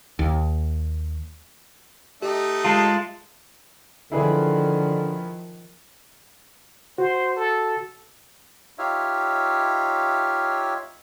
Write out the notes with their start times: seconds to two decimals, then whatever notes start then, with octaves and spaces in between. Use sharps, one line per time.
0.19 D#2
2.22 A3 D#4 G4
2.64 G#3 F4 A5
4.12 D3 D#3 F3 E4 G#4 B4
6.98 F#4 C5
7.37 A4
8.78 D#4 F4 G4 C#5 E5 F5